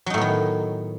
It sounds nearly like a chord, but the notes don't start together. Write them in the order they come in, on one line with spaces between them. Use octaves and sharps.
F#3 D#4 A2 B3 D#3